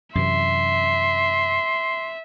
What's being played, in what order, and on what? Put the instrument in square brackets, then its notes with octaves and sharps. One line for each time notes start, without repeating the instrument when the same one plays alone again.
[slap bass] F#2 C3 E3 [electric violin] E5 [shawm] C6